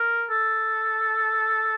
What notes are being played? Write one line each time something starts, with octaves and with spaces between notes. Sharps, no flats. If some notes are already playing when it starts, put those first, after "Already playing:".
Already playing: A#4
A4